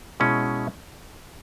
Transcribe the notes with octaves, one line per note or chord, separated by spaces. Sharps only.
B2 G#3 C#4 E4